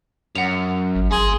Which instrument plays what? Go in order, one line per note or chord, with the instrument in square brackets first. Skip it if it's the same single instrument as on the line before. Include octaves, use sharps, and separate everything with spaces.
[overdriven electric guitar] F#2 [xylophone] F#5 F7
[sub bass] G#1
[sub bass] G1 [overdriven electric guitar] A#3 C6 [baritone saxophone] G#4